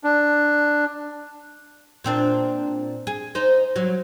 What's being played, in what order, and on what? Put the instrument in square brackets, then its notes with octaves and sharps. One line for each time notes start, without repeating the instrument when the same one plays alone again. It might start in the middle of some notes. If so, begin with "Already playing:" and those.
[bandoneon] D4
[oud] A#2 C4 D4
G#4
D#4 C5
F#3